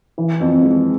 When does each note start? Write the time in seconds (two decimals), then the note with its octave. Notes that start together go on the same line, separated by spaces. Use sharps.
0.18 E3
0.40 F2
0.63 G#3